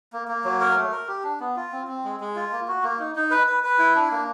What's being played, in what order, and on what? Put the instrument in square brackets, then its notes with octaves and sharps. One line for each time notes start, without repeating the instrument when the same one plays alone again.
[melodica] A#3
A#3
F#3
A#4
A3
A#4
G4
D4
B3
F4
C4
C4
G#3
G#3
F4
A#3
F#4
A#3
D#4
D#4
B4
B4
B4
E4
D4
A#3